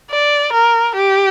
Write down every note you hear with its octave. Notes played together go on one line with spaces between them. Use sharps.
D5
A#4
G4